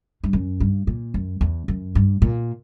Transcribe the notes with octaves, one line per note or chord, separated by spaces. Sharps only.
G2
F#2
G2
A#2
F#2
E2
F#2
G2
A#2